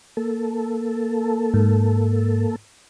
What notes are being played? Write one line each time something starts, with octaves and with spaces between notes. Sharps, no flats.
A#3 A4
G#2